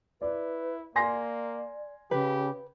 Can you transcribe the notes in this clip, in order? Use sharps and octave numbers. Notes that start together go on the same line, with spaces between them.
E4 B4 D5
A#3 D5 G#5 C6 A#6
C#3 G4 B4